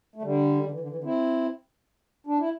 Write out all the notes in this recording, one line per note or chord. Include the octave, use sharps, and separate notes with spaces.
A3
D3 G3
D3
E3
D3
E3
D3
C4 E4
D4
E4